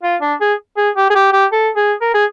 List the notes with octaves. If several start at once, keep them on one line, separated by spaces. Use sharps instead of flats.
F4
D4
G#4
G#4
G4
G#4
G4
G4
A4
G#4
A#4
G#4